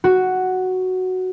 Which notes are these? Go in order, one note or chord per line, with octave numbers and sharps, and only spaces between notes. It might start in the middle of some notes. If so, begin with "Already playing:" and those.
F#4